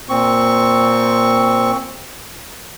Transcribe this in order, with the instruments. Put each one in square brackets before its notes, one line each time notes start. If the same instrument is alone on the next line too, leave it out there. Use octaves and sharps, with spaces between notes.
[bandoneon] A#2 C4 C#6